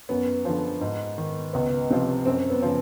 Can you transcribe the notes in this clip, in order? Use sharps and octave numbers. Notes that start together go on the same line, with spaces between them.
F#2 B3
D3 F3
G#2
D#3
C#2 B3
C3 F3
F#2 C4
B3
C#3 F3